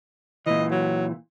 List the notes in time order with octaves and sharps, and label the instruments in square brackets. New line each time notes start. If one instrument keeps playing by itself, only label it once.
[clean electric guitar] A#2 E3 [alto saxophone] D#5
[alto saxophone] F#3